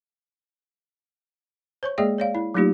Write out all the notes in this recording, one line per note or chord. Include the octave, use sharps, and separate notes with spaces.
C5 C#5 C#6
G#3 A#3 G#4 D5 E5 G5
C#5 D5 F5
E4
F#3 A3 A#3 D#4 F4 G4